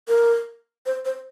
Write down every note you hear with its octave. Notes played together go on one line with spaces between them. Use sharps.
A#4
C5
C5